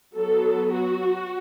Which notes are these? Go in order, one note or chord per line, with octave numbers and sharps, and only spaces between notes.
F#3 B3 A4
F#4